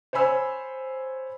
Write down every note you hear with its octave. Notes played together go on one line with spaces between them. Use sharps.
C5 C#5 G#5 B5 E6